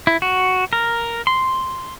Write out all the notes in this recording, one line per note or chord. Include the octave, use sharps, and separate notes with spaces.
E4
F#4
A#4
C6